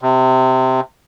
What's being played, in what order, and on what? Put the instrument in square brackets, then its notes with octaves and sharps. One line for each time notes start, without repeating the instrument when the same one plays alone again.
[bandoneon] C3